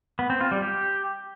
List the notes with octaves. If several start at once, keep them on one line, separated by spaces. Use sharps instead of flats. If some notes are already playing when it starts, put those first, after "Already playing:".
B3
C4
F4
G3
G4